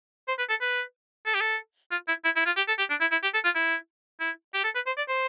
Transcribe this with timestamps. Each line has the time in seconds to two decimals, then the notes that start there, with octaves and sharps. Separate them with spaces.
0.28 C5
0.38 B4
0.49 A4
0.61 B4
1.26 A4
1.34 G4
1.41 A4
1.91 F4
2.08 E4
2.24 E4
2.36 E4
2.46 F4
2.56 G4
2.68 A4
2.79 G4
2.90 D4
3.01 E4
3.11 E4
3.23 G4
3.34 A4
3.44 F4
3.55 E4
4.20 E4
4.54 G4
4.64 A4
4.75 B4
4.86 C5
4.97 D5
5.08 C5